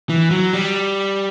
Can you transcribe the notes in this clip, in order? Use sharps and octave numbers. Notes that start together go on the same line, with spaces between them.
E3
F#3
G3